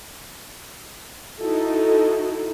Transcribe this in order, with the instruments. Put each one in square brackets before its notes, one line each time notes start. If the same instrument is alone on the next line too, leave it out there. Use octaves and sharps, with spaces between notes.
[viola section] D#4 E4 F#4 A4